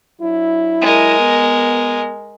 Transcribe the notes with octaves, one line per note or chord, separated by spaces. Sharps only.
F#3 D4 E4
G#3 A#4
B3